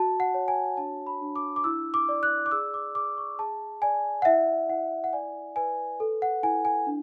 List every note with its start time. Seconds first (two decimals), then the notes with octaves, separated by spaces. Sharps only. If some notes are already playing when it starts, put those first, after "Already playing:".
Already playing: F#4 A5
0.20 F#5
0.34 C#5
0.48 G#5
0.77 D4 A5
1.07 B5
1.21 D4
1.36 D6
1.56 D6
1.64 E4 E6
1.94 D6
2.09 D5
2.23 F#6
2.46 D6
2.51 G#4 E6
2.74 D6
2.95 G#4 D6
3.18 C#6
3.39 G#4 A5
3.82 D5 G#5
4.22 F#5
4.25 E4 E5
4.69 E4 F#5
5.04 F#5
5.13 D5 G#5
5.56 B4 G#5
6.00 A4
6.22 F#5
6.43 E4 G#5
6.65 G#5
6.87 D4